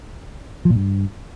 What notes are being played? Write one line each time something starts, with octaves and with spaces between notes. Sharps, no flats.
F3
A#2
G2